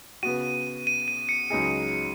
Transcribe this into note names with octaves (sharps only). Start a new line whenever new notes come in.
C#3 B3 F#4 D#7
D#7
D#7
C#7
C#2 C#3 F#3 D#4 G#4